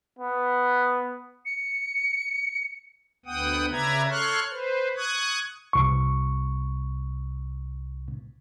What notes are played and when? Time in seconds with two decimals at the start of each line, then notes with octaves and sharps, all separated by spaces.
0.19 B3
1.45 C#7
3.26 D2 B3 F#5 G5 D#6
3.72 C#3 B4 D5 E5 A#5 G#6
4.09 A4 C#5 C6 C#6 F6 F#6
4.51 B4 C5
4.96 C#6 D#6 F#6 G#6
5.73 C2 C#6